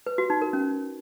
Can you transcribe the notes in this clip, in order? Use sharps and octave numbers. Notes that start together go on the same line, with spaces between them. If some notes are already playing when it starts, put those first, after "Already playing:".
B4
F#4
D#4
A#4
C#4